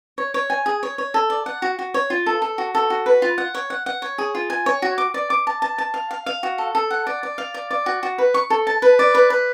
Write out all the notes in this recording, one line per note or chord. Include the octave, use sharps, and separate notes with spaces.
C#5
C#5
G#5
G#4
C#5
C#5
A4
D5
F#5
F#4
F#4
C#5
F4
A4
A4
F#4
A4
F#4
B4
F4
F#5
C#5
F#5
F#5
C#5
G#4
F4
G#5
C#5
F#4
D6
D5
D6
A5
A5
A5
F5
F5
F5
F#4
A4
A4
F#5
D5
D5
F5
D5
D5
F#4
F#4
B4
C#6
A4
A5
B4
D5
B4
B4